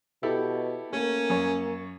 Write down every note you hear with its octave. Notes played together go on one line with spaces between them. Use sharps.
B2 E4 G4 A4
A3 A#3 C#4
F#2 C#5